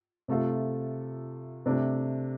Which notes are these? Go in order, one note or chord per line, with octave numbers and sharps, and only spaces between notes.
C3 A3 F4 A4
C3 A3 D4